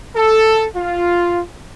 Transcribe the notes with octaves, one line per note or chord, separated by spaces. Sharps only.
A4
F4